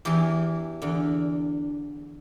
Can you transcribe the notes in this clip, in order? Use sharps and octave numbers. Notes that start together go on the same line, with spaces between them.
E2 E3 G4
E2 D3